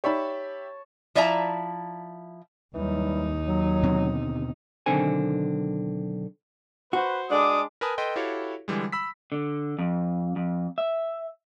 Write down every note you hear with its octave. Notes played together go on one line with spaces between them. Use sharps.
D#4 G4 C#5 D5 E5 A5 B5
F3 E4 D5 E5 A5 A#5
D#2 E3 F#3 G3 D#4
F#3
B2 D3 C4
B1 D3 D#3 C4 A4 G#5
F#4 B4 C5
G#3 D4 D6 D#6
A#4 B4 G#5 A5 B5 D#6
A4 B4 D#5 G5 C6
E4 F#4 G4 A4 C#5 F5
D3 E3 G3 G#3
B5 E6 B6
D3
F2
F2
E5